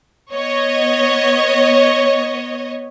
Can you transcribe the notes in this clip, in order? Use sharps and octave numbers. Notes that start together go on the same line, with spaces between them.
B3 C#5 D#5